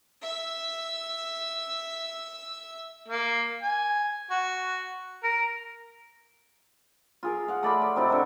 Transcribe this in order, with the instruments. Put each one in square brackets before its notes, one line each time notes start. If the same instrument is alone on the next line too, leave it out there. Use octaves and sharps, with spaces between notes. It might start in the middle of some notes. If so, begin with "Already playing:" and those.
[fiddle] E5 E6
[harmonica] A#3
G#5
F#4
A#4
[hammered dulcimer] F4 G#4 A#4
F5 F#5
A3 D5 B5 C6
D5
C3 D#4 E4 D5
D3 A#4 C#6